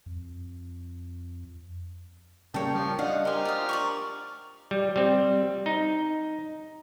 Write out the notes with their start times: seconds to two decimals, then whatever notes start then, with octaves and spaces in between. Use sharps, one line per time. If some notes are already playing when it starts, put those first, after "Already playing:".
0.06 F2
2.54 C#3 G3 A#3 C#5 G5 A5
2.74 F3 G3
2.99 D4 D#5 F5 F#5
3.25 G4 A#4 C5 D#5 G#5
3.45 F4 D#6
3.69 D5 A#5 C#6
4.71 G3
4.96 G3 C4
5.66 D#4